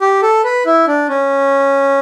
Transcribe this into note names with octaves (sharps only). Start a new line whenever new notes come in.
G4
A4
B4
E4
D4
C#4